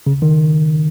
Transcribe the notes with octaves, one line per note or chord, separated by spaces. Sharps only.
C#3
D#3